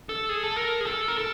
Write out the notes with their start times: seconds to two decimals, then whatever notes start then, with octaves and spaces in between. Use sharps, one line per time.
0.09 A4
0.29 G#4
0.43 A4
0.57 A#4
0.80 G#4
0.87 A4
1.08 A#4
1.18 A4